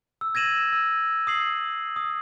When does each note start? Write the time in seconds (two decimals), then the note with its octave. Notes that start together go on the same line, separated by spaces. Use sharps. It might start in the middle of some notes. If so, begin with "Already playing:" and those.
0.21 E6
0.35 G#6 A#6 D#7 E7 F#7
0.73 E6
1.27 D#6 C7 F#7
1.96 D#6